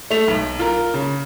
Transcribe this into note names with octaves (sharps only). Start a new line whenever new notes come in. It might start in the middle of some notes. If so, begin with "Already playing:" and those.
A3 F7
B1
F4 A#4
C#3